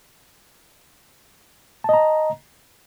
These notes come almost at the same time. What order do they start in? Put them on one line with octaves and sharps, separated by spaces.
A5 D#5 A#5